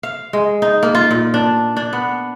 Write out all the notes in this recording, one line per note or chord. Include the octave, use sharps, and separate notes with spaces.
F5
G#3
D#4
A#3
F4
A#2
D4
D4
B3